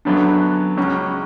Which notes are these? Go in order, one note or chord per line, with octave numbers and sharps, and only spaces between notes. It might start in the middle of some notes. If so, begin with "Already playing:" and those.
F#2 D3 F#3 B3 D4
C#2 C#3 F#3 C#4